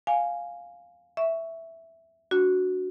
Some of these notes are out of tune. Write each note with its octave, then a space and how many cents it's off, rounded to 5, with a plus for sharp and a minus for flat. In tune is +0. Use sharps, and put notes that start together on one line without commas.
F5 +5 G#5 +0
E5 +0 C#6 +15
D4 -15 F#4 +0